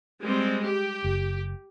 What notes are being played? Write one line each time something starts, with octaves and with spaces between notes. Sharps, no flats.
G3 G#3 C4
G4
F#1